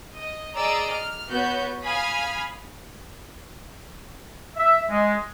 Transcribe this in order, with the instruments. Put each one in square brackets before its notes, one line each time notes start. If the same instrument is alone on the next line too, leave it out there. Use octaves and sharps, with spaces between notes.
[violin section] D#5
G#4 D5 D#5 A#5 E6 D7
F6
B3 F#4 C#5 G6
F5 G#5 B5 D#6 F6 G#6
[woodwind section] E5
G#3